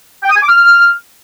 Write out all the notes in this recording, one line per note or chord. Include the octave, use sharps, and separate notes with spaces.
G5
D#6
G#5
D6
F6